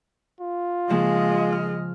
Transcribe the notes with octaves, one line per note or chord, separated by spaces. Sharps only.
F4
C#3 F3 G#3 A#3 D#5
F6